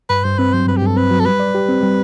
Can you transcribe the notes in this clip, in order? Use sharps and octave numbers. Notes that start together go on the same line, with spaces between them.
G2 B4
G2 C5
C4 B4
F#3 C5
G2 B4
G4
G2 A4
C4 B4
F#3
A4
G3 B4
D5
G4
C4
G3